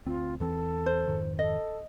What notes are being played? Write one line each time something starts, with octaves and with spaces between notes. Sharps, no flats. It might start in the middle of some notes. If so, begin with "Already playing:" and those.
D2 C4 F4
E2 E3 C4 A4
C5
F2 G#2 D#3
A4 D#5